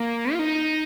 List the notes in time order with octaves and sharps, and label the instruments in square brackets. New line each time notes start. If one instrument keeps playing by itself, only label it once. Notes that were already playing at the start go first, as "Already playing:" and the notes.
Already playing: [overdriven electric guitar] A#3
F4
D#4